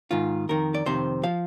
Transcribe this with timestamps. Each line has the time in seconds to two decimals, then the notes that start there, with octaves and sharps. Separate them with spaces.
0.11 G#2 D#3 F4
0.49 F2 D#3 A#4
0.75 D5
0.86 F2 C3 D#3 C5
1.23 F3 F5